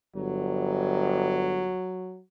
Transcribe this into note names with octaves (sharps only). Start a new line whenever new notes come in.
G1 F#3